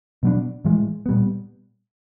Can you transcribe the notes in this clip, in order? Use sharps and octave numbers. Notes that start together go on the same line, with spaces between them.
B2 F#3 B3 D4
A2 E3 G#3
A#2 G3 B3